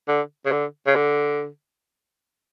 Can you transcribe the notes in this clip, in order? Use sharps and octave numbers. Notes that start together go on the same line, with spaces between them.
D3
C#3
D3
C#3
D3